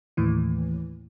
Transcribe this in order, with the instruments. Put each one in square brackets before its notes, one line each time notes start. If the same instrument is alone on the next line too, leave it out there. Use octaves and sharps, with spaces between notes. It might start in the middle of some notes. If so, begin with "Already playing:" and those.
[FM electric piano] D#2 A2 E3